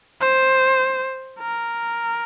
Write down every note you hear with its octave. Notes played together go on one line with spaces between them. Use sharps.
C5
A#4